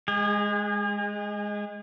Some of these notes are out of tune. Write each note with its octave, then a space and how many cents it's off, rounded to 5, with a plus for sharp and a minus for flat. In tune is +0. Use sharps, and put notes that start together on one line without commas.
G#3 +0 G#4 -35